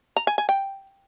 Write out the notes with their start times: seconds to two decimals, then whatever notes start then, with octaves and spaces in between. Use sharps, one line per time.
0.17 A#5
0.27 G#5
0.38 G#5
0.49 G5